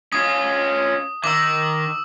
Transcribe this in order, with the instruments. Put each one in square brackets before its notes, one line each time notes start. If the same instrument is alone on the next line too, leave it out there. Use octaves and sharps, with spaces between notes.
[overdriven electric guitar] C#4 F4 [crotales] D#6
[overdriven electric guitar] D#3 [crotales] D6 E6